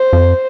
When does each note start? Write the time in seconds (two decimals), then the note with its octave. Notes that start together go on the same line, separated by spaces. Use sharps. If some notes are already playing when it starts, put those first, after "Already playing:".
Already playing: C5
0.13 F2